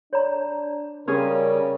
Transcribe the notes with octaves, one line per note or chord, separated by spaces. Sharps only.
D4 C#5 D5 A#5
C#3 G3 C#4 G4 G#4 A#4 D#6